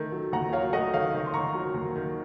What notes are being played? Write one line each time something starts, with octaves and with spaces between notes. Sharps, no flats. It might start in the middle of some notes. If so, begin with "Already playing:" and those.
Already playing: D#3 A3
F#3
D#2 F#5 A#5
F#3 C#5 F5
A3 D#5 F#5
D#3 C#5 F5
D#3
C6
D#3 A#5 C#6
F#3
D#2
D#3